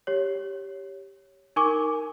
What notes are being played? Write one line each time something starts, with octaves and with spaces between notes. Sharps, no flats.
G4 C#5
D#4 A#4 G#5 C#6 D6